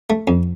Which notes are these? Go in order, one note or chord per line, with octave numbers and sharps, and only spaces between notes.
A3
F2